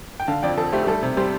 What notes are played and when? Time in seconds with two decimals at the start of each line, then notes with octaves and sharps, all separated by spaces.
0.20 G5
0.27 D3 F5 A5
0.43 F2 D5 G5
0.57 F2 A4
0.72 A3 G4 C5
0.83 G4
0.87 G3 A4
1.03 C3
1.17 G3 G4 C5